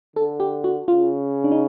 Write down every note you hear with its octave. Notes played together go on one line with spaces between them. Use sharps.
D3 A4
G4
F#4
C#3 F4
D4
D#4